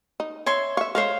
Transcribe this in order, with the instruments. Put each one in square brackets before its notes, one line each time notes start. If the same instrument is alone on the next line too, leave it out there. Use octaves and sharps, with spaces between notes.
[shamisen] D#4
[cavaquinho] C#5 E5 C6
[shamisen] E5 F5 [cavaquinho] C#6
[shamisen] G#3 [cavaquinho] C5 C#5 F5